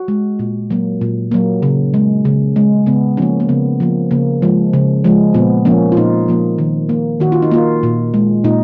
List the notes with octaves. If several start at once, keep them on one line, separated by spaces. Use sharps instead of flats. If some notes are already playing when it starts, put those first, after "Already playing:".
Already playing: F#4
G#3
A#2
F#3 A#3
A#2
F#3 A#3
C#3
G#3
C#3
G#3
C#3 B3
F3 A#3 C#4
A#3
C#3 B3
F3 A#3
C#3 A#3
F3 G#3
C#3
F3 G#3
A#2 B3
F3 A#3 C#4
F4
A#2 D#4
F3 A#3
D#3
A#3
D#3 F#4
F4
D#4
A#3 F4
A#2
G#3
A#2 D#4